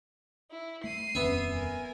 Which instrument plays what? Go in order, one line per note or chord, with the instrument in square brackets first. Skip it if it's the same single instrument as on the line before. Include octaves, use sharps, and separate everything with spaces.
[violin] E4
[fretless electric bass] A3 [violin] C7 D#7
[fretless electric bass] D#1 F2 C#4 [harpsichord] B3 E5
[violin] A#4 G#5